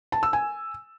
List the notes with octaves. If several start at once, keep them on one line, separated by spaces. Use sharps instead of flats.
A5
E6
G#5